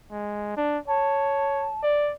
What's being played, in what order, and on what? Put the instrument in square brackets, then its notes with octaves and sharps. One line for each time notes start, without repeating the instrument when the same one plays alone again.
[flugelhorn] G#3
D4
[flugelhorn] C#5 [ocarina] A5
[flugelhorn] D5